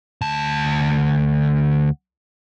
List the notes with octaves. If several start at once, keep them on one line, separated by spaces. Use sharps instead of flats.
D2 A5